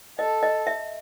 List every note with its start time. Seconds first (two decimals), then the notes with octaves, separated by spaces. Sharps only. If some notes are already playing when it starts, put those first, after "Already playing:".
0.19 A4 D#5
0.43 D#5
0.67 E5